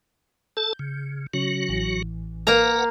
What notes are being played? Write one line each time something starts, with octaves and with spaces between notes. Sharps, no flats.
A4 A5 G6
C#3
C#3 F#3 C#4 F#4
A1 E3
A#3 A#4 B4 F#5 A#5